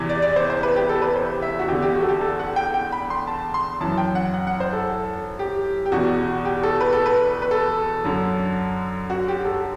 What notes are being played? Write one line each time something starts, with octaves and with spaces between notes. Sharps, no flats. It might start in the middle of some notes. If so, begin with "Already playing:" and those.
Already playing: E2 C3 E3
D5
D5
C5
C5
B4
G4
A4
B4
C5
E5
F#4
E2 D3 G4
G4
F#4
A4
G4
A4
F#5
G5
G5
B5
C6
A5
C6
F#2 E3 A5
G5
F#5
F#5
F#5
C5
A4
G4
G4
E2 B2 F#4
G4
A4
B4
A4
B4
B4
A4
F#2 D3
F#4
G4
A4